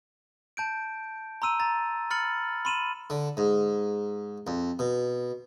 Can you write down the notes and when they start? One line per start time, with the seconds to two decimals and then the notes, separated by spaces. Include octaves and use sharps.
0.57 A5 G6 D7
1.42 A#5 C6 E6 D#7
1.60 A#5 A6
2.10 B5 F6 A6 C#7 F#7
2.65 B5 C6 D#7 E7 F#7
3.10 D3
3.37 G#2
4.47 F2
4.79 B2